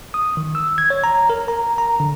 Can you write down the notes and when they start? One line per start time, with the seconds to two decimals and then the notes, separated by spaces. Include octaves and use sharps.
0.14 D#6
0.37 D#3
0.55 E6
0.78 G#6
0.90 C#5
1.04 A#5
1.30 A#4
1.48 A#5
1.78 A#5
2.00 D3